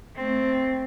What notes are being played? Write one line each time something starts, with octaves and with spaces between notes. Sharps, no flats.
A3 C4